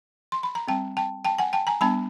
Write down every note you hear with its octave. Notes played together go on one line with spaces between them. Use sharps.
C6
B5
A#5
G3 C4 G5 A5
G5 A5
G5 A5
F#5 G#5
G5 A5
G#5 A#5
G3 B3 D4 A5 B5